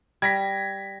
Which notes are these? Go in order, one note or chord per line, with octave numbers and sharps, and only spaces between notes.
G3 G#6 A#6 B6